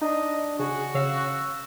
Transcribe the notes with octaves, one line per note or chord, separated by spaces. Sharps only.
D4 D#4 D#5
C#3 F#4 G#4
C#3 C#4 F5 E6